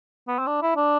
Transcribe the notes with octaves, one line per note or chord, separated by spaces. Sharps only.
B3
C4
D4
E4
D4